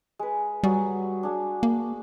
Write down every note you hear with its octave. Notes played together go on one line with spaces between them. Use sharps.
G#3 B4
F#3 G3 F#4 G#4
D4 G#4
A#3